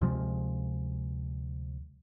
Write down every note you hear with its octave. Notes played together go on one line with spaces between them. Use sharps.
D2 C3 F3 G#3